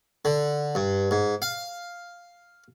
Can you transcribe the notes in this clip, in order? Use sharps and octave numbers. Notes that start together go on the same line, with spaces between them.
D3
G2
G#2
F5